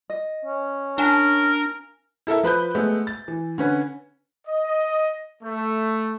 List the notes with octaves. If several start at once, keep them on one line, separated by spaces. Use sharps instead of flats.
D#5
C#4
D4 A#4 F5 G#5
E4 A4 A#4 E5
F3 B4 B5 G6
G#3 A3 B3
A6
E3
D3 C#4 B4
D#5
A3